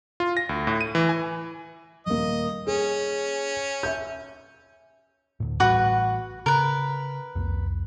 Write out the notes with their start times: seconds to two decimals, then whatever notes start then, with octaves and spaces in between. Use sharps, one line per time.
0.20 F4
0.37 A#6
0.49 D2
0.67 A2
0.81 D#7
0.95 E3
1.09 G#5
2.06 D#1 A#3 D#5
2.67 C#4 G#4
3.83 E5 G6
5.40 D2 A2
5.60 A1 A2 G3 F#4 B4
6.46 C#3 A#4 B4
7.35 C2 F2